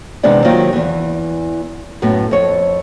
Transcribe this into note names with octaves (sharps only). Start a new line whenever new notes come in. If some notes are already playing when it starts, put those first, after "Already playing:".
C3 D#3 E3 G#3 B3 D4
D#3 F#3 A#3 C4 F4
E2 E3
F#2 A2 B3
F2 C#5